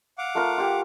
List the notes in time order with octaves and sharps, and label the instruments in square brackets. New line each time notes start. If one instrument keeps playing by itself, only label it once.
[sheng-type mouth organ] F5 F#5 D6
[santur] A3 F4 A#4
F4 G4